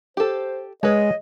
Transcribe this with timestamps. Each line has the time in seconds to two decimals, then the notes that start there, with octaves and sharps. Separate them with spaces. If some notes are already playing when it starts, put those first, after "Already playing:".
0.17 G4 A4 C5
0.83 G#3 B4 C#5 D#5